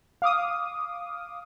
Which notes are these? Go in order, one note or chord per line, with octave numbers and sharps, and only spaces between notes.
F5 D6 D#6